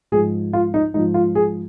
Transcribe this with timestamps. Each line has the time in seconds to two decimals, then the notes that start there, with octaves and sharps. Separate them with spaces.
0.12 G#2 F3 G#4
0.53 F4
0.74 D#4
0.94 G#2 F3 D#4
1.14 F4
1.35 G#4